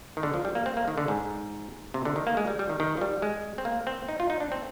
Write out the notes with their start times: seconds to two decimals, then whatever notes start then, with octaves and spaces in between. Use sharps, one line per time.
0.17 D#3
0.23 D3
0.34 F3
0.45 G3
0.55 A#3
0.66 C4
0.77 A#3
0.88 D#3
0.98 D3
1.08 G#2
1.94 C3
2.05 D3
2.16 D#3
2.27 A#3
2.37 G#3
2.47 G3
2.59 G3
2.69 D#3
2.80 D#3
2.97 F3
3.01 G3
3.22 G#3
3.58 C4
3.65 A#3
3.87 C4
4.08 D#4
4.20 F4
4.30 D#4
4.40 D4
4.52 C4